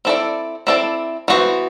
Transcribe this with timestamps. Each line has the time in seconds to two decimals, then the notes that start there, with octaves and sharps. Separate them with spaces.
0.05 C4 E4 A4 D5
0.67 C4 E4 A4 D5
1.28 E3 B3 F#4 C5